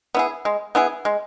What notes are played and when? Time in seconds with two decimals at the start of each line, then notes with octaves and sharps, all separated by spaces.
0.15 B3 E4 G#4
0.45 G#3
0.75 B3 E4 G#4
1.05 G#3